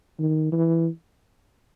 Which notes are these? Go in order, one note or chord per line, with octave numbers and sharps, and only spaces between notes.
D#3
E3